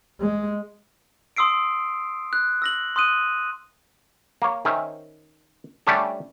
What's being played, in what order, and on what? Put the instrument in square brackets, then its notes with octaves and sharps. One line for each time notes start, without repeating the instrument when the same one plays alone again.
[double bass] G#3
[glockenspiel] C6 D#6 E6 C7 D7
F#6
E6 A#6 F#7
C6 D#6 F#6 D#7
[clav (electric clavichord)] A#3 C#5
D#3 C#4 C5 E5
G3 A3 C#4 D4 G4 A4